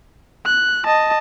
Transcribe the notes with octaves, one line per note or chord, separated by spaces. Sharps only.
F#6
D#5 A5